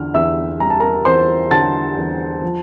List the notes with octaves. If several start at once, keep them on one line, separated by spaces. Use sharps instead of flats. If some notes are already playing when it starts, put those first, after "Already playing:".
Already playing: E2 D3 F6
E2 E5 E6
G3 A#5
A5
A#4 A#5
E2 C5 C6
D3 A5 A6
E2
F3